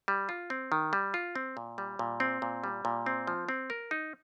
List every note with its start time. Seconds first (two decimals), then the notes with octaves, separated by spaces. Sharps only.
0.08 G3
0.29 F4
0.50 C4
0.72 D#3
0.93 G3
1.14 F4
1.36 C4
1.57 A#2
1.78 G3
1.99 A#2
2.20 C4
2.42 A#2
2.64 G3
2.85 A#2
3.06 C4
3.27 F3
3.49 C4
3.70 A#4
3.91 D#4